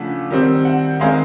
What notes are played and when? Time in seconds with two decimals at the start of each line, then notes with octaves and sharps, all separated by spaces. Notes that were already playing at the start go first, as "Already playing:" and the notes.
Already playing: C#3 F3 A3 D4 F#5
0.31 D#3 G3 C4
0.65 F#5
1.00 D#3 G#3 C4 D#4 F5